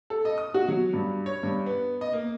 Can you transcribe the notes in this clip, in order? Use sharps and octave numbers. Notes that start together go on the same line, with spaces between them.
A4
D#5
D#6
F#4
F#3
G2
C#5
G2
B3
D#5
A#3